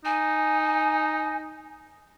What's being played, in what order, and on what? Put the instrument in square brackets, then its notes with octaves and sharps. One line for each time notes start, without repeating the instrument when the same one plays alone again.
[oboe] D#4 [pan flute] G#5